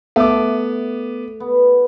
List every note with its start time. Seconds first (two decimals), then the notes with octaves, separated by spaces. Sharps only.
0.16 A3 B3 D6
1.40 B3